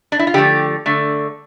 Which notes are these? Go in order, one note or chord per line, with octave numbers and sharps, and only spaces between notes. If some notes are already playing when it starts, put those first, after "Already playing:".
D4
E4
F4
D3 F3 A3 G4
D3 A3